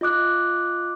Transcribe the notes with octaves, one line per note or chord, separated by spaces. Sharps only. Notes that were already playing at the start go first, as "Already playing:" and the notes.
F4 D#5 D6 F#6